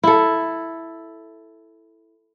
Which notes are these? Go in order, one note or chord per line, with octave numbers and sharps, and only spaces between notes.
E4 A4